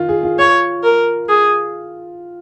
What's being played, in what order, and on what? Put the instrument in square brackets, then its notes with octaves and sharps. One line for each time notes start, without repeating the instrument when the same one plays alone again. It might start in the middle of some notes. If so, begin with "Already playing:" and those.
Already playing: [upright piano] D#3 F4
G#4
F4
[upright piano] F4 [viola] C#5
[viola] A#4
G#4